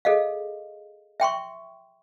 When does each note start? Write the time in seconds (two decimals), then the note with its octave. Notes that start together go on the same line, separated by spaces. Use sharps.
0.05 G#4 A4 D#5 F5
1.20 E5 G5 C6 C#6